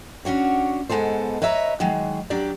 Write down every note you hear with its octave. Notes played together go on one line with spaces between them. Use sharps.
C#4 D4 F#4 C#5
G#2 G#3 B3 A4 C5
B4 C#5 D#5 E5 A#5
D#3 F#3 G#3
F#3 D4 G4 D5